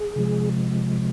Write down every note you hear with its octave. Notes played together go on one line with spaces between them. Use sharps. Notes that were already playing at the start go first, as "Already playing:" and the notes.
Already playing: G#4
C3 F3 G#3